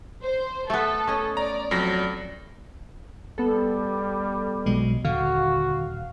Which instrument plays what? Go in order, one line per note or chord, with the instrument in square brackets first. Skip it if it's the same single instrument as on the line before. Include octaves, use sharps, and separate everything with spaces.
[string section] C5
[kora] A3 B3 [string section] A4
[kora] C#4 D#5
[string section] D5 [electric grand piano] A#5
[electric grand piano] F2 F#3 A#6
[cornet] G3 [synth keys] B3 A4
[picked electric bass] B1 B2 F#3 [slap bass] G#3
[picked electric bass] D#1 [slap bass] D3 [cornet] F#4 [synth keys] F5